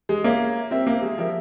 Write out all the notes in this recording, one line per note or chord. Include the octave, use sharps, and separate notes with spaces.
G#3
A#3 A#4 C#5 E5
C4 G4 A#4 E5
A#3
G#3
F3 G4 A#4 E5